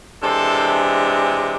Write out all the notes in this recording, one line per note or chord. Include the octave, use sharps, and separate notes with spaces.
C3 E3 G#3 D4 A4 C5